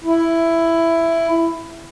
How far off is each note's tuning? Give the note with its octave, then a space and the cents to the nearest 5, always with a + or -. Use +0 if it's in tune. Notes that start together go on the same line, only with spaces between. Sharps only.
E4 +10